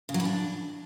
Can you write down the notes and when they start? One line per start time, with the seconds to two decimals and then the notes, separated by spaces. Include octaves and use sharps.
0.09 C#3
0.14 F#3
0.20 E3
0.25 D4